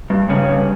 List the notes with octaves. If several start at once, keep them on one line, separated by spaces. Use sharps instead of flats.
G2
G2 C#3 C#4
G2